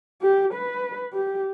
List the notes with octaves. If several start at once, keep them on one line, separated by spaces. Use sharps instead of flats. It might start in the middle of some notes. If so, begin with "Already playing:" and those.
G4
B4
G4